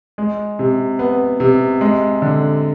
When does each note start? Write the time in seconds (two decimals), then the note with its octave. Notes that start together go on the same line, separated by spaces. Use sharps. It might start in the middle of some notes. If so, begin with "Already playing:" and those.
0.18 G#3
0.59 C3
0.99 B3
1.40 C3
1.81 G#3
2.22 D3